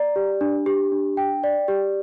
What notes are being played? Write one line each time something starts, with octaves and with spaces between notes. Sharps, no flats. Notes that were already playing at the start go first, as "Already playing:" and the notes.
Already playing: D5 A#5
G4
D4
G4
D4
G5
D5
G4